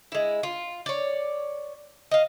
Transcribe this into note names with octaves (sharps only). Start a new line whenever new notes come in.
G#3 E4
F4
C#5 D5
D#5 F5